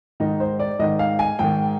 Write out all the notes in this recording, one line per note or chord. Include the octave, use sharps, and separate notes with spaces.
G#2 D#3 D#4
C5
D5
G#2 D#3 D#5
F5
G#5
G#2 D#3 G5